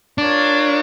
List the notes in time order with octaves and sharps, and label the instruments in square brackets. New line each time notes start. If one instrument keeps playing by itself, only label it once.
[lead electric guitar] D4 [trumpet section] F4 A#4 C#5